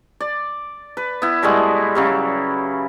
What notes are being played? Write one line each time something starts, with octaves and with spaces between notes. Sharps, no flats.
D5
B4
B3 E4
A2 G3 G#3 F#4
C#3 F#3 G3